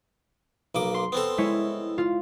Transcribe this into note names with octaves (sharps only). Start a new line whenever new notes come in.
B1 A#3 D6
C6
B3 C4 A4
G#3 E4 C#5
F4